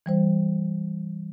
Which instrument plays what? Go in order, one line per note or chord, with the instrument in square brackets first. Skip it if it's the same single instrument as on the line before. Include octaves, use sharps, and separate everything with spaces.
[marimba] E3 G3 C5